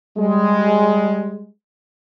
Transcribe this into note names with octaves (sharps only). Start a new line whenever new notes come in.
G3 G#3